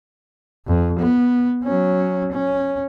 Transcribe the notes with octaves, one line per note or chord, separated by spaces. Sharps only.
F2
B3
F#3 C#4
C#4